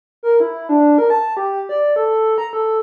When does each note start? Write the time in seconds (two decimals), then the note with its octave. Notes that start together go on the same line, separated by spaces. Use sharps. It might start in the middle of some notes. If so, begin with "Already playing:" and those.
0.23 A#4
0.40 E4
0.69 D4
0.98 A#4
1.10 A5
1.37 G4
1.69 D5
1.96 A4
2.38 A#5
2.53 A4